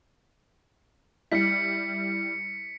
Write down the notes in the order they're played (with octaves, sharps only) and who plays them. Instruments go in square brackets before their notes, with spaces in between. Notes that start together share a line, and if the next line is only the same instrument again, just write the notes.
[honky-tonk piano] G3 E4 [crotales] B6 C#7